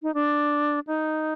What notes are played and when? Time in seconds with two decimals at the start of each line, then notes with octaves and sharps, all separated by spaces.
0.03 D#4
0.14 D4
0.87 D#4